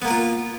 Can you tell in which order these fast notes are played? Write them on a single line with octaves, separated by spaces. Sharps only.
B3 A#3 A#4 F4